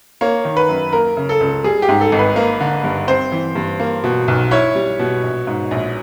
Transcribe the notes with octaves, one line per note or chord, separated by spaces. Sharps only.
A#3 C#5
D#3
B4
F#2
A#3 A#4
C#3
A4
C#2
G3 G#4
G4
G#2
A4
G#1
B4
A#3
D3
G2
C4 C5
E3
G2
A#3
B2
B1
E4 C#5
G3
B2
A#1
G#2
A#1